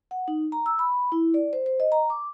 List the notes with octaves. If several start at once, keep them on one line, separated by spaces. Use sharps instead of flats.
F#5
D#4
A#5
E6
B5
E4
D5
C5
C5
D#5
A#5
D6